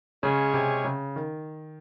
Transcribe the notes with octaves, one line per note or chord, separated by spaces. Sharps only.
C#3 G#3 C#4 G#4 C#5
C3
C#3
D#3